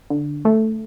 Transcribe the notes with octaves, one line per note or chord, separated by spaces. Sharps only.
D3
A3